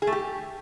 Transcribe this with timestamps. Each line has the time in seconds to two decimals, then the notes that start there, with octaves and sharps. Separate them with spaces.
0.02 G#4
0.07 A3
0.12 G4